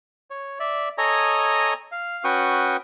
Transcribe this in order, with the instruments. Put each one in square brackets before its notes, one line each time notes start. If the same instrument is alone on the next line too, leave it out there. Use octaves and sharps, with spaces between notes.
[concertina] C#5
D5 E5
A4 C#5 D#5 G#5 A#5 D#6
F5
C#4 F#4 B4 G5 C#6 D#6